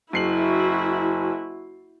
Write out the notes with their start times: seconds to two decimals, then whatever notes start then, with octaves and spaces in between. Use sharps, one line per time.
0.13 F#1 E4 F#4 C7 F#7